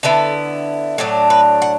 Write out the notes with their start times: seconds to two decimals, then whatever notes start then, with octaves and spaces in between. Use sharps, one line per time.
0.03 D3 B3 E4 A4
0.98 A2 F#3 D4 A4
1.30 B4
1.62 F#5